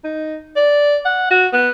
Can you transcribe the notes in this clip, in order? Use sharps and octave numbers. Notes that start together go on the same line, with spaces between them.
D#4
D5
F#5
F#4
B3